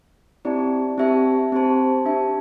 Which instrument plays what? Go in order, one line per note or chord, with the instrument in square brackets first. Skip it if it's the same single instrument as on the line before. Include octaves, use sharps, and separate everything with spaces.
[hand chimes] C4 E4 G4 D5 A5
C4 G4 E5 A5
C4 G4 C5 A5
D4 G4 E5 A5